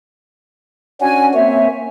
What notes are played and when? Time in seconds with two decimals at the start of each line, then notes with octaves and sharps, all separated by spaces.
1.01 C#4 D4 F#4 G#5
1.34 A#3 C4 C#5 E5